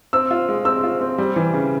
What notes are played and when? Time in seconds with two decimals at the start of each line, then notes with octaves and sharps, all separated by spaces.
0.13 C4 E6
0.31 F4
0.48 G#3
0.65 C4 E6
0.83 F4
1.01 C4
1.18 G3
1.36 E3
1.54 C#3